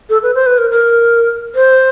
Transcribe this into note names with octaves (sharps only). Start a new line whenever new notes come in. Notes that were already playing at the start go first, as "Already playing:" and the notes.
A4
B4
C5
B4
A#4
A#4
C5